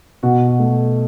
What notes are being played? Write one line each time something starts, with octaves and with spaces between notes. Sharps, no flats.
B2 F#4
F#4
A3